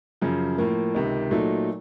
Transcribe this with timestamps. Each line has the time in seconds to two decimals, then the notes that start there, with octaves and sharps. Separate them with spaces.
0.21 F#2 C#3 F3
0.58 A2 F3 A#3
0.94 C#2 C3 D#3
1.31 A#2 F#3 A3 D#4 A4